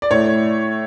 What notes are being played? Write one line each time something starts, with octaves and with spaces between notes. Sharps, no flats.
D5
A2 C#5